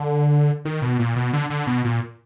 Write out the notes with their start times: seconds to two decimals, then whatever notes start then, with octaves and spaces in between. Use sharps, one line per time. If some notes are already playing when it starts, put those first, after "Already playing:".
Already playing: D3
0.65 D#3
0.82 B2
0.99 A#2
1.16 B2
1.33 D3
1.50 D3
1.67 B2
1.85 A#2